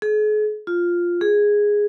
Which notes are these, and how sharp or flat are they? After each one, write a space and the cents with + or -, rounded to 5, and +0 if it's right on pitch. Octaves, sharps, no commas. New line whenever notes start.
G#4 +40
F4 +0
G#4 -5